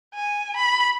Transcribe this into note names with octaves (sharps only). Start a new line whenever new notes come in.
G#5
B5